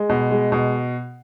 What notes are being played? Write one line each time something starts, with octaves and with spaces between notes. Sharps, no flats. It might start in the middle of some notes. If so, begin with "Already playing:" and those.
Already playing: G#3
B2
G#3
B2